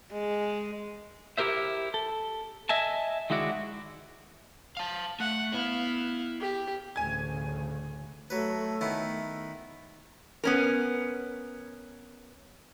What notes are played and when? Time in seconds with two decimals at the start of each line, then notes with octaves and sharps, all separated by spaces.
0.12 G#3
1.38 E4 G4 A#4 C5 E5
1.94 A4
2.69 D#5 E5 G#5 A5
3.30 D#3 G#3 E4 F#4 D5
4.77 F5 A5
5.20 A3 F#5
5.52 B3 E4 F5
6.40 G4
6.96 A1 D2 C#3 G#5 G#6
8.30 F#3 A3 B4
8.81 D#3 B3 E4
10.44 B3 C#4 A#4